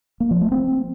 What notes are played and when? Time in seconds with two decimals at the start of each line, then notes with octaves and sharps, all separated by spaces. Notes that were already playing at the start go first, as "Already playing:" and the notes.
0.20 A#3
0.31 F3
0.41 A3
0.52 C4